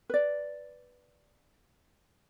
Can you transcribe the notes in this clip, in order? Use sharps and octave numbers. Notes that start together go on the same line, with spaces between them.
B4 D5